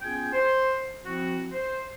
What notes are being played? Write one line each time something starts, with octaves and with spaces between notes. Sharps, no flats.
B3 C#4 F4 G#4 G5 G#5
C5
F3 C4 E4 F#4
C5